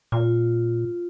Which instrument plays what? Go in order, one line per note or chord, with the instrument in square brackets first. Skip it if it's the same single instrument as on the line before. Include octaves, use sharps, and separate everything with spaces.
[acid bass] A#2 [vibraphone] F4